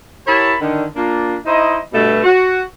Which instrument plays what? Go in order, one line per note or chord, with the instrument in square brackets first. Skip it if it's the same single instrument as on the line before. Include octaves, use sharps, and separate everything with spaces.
[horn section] E4 G4 A#4 C#5 A5 B5
D3 D#3
A#3 D4 F4
D#4 E4 C5 D#5
G2 B2 A3
F#4